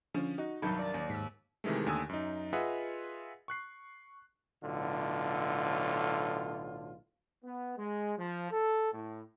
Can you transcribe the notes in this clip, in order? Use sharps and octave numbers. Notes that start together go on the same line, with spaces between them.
D3 F3 C#4
D#4 F#4
C2 G2 D#3 F#3 B5 G6 C#7
A#4 D5 A6
D#2
G#2 E6 B6
C3 D#3 E3 G#3 A3
D#2 D3 A3 G#5 D#6 E6
F#2 D#4
F4 G#4 B4 D#5 E5 F#5
C#6 F#6 C7
B1 A2 D3 F4
B3
G#3
F3
A4
A2